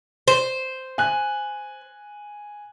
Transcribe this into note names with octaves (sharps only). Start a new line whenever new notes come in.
C5
G#5 F#6